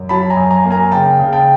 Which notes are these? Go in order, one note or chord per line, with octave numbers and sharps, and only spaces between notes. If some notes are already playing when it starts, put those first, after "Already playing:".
Already playing: F#2
F#3 A5 B5
G#5 A#5
F#2
G#5 A#5
A#3
G#5 A#5
C#3 G5 A5
C#3
G5 A5